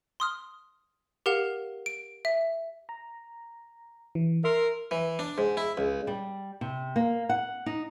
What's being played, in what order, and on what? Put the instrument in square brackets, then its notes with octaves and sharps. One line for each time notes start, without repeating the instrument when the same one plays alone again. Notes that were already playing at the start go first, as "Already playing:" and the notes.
[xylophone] C6 D#6 F6
G4 A#4 F5 F#5 E7
D7
E5
[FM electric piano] A#5
E3
[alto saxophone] A#4 [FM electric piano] E5 C6
[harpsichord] E3
D4
G#2
E4
C#2
[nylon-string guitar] G3
C3
A#3
F#5
D#4